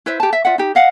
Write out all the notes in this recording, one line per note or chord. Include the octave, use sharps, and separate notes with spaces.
E4 B4 C5 E5
G4 A5
E5
F4 D5 E5 F#5
D#4 G4
D#5 F5 F#5